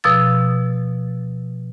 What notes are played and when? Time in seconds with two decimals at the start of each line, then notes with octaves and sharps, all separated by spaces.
0.04 B2 F3 E6 A6